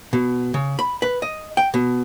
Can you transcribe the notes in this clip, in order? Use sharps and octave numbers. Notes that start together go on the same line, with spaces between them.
B2
C#3
B5
B4
D#5
G5
B2